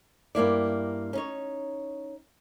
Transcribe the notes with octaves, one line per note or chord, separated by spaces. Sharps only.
G2 A#3 E4 D5
C#4 D#4 C#5